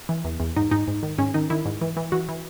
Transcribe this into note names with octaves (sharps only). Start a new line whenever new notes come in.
E3
E2
E2
G#2 D#4
G#2 D#4
G#2
D#3
G#2 C#4
D#3 D#4
D#3 E4
G#2
E3
E3
E3 F#4
E3